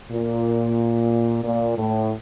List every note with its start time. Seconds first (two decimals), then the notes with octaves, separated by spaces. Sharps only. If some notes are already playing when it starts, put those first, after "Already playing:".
0.11 A#2
1.44 A#2
1.77 A2